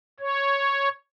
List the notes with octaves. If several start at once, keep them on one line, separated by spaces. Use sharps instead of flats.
C#5